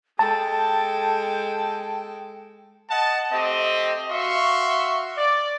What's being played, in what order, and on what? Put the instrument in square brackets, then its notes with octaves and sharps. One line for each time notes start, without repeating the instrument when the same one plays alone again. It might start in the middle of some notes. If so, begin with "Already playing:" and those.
[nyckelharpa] G#3 A4 [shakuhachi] G5 [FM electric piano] A5
[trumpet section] D#5 F#5 A5
A3 C4 G4 D#5
F#4 E5 F5 C6 C#6
D5